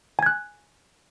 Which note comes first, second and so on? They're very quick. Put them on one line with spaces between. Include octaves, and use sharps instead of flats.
G#5 G#6 F#6